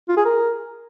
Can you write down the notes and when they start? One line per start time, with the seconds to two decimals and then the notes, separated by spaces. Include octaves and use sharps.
0.09 F4
0.17 G#4
0.25 A#4